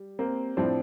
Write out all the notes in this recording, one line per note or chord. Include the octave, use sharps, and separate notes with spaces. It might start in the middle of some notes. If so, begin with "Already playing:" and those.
Already playing: G3
A#3 C4
A2 F3 C4 D4